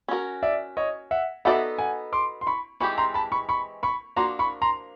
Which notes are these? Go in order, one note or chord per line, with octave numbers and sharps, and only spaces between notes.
C#4 F#4 A#4
D5 E5
C#5 D#5
E5 F#5
B3 D#4 F#4 A4 D5 E5 F#5
F#5 G#5
C6 D6
C6
B5 C#6
E3 G#3 C4 D#4 G4 B5 C#6
A#5 C6
A5 B5
B5 C#6
B5 C#6
B5 C#6
F3 A#3 D4 F#4 A#5 C6
B5 C#6
A#5 C6